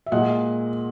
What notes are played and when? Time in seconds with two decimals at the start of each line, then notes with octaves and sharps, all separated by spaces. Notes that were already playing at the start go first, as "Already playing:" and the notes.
0.06 E5
0.12 A#2 G#3 D#5 F#5